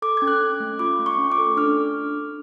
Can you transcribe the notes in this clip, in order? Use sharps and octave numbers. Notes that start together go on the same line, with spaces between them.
A4 D6
C#4 G#6
F#6
C#4
A3
F4 D6
A3
C#6
C#4
D6
A4
D4 F6